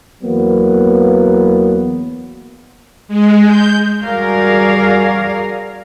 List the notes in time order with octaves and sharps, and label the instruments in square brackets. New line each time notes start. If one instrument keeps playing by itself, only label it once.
[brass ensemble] E2 F#3 A#3 B3
[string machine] G#3
G6
[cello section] G3 F#4 G#4 A#4 D5 F5